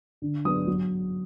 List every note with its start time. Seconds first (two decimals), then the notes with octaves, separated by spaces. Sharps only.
0.22 D3
0.45 F#3 B3 D4 D#6
0.67 F#3